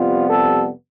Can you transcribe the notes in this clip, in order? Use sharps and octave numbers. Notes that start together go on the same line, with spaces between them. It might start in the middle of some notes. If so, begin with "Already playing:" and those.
Already playing: F2 C3 G3 B3 F4
A4